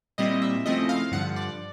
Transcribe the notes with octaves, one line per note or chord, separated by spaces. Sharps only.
A#2 G3 C4 E4 D#5
E5
C#3 F3 A3 C4 E4 D#5
F5
G2 D3 F3 F#5
D5